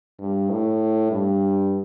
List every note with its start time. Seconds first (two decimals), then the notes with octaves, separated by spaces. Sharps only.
0.19 G2
0.51 A2
1.11 G2